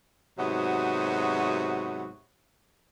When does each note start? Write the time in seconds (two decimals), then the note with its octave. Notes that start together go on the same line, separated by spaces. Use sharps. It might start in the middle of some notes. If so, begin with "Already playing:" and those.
0.38 G#2 C3 F#3 B3 F#4